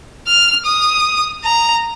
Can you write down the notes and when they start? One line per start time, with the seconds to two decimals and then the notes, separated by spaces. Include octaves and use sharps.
0.27 F6
0.66 D#6
1.44 A#5